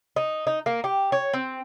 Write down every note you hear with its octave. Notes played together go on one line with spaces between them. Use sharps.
D#4
D#4
A#3
G4
C#5
C4